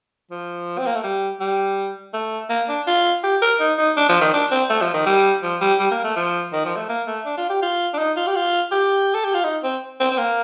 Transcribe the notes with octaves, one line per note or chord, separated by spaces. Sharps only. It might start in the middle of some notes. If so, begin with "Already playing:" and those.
F3
C4
A#3
A3
G3
G3
A3
A#3
D4
F4
G4
A#4
D#4
D#4
D4
F3
D#3
D4
C4
A3
F3
D#3
G3
F3
G3
G3
A#3
A3
F3
D#3
F3
A3
A#3
A3
D4
F4
G4
F4
D4
D#4
F4
G4
F4
G4
A4
G4
F4
D#4
C4
C4
C4
A#3